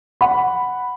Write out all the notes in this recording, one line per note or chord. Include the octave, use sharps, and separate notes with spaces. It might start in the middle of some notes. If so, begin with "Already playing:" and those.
F#5 B5